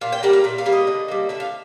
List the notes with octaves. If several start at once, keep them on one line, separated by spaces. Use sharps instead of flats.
A#2 F5
G5
G3 A#3 F#5
F5
A#2 E5
F5
G3 A#3
D#5
D3
G3 A#3
D3 E5
F5